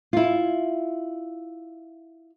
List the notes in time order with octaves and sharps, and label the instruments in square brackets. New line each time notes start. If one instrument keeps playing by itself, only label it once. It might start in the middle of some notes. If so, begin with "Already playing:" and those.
[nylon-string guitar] E4 F4